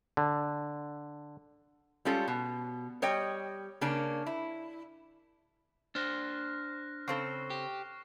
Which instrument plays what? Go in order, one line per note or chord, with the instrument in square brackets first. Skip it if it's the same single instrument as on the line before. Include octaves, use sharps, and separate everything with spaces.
[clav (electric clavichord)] D3
[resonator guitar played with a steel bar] G3 G#3 C#4 F4 A4
B2
G3 C#5 D#5 G5
C#3 A#3 C#4 D4
E4
[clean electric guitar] D4 C5 [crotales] F6 F#6 A#6
[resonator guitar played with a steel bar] C#3 C4 A4 [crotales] C#6 C7
[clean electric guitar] G4